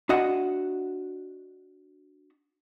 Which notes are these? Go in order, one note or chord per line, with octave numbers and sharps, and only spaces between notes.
D4 F#4 D#5 E5 F#5